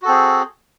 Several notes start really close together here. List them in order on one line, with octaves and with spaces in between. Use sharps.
F#4 A4 C4 G#4